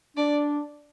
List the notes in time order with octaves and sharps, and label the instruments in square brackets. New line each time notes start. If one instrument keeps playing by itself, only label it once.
[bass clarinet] D4 [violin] D5